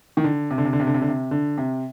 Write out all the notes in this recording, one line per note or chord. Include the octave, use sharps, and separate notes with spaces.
D#3
D3
C3
D3
C3
D3
C3
D3
C3
D3
C3
D3
C3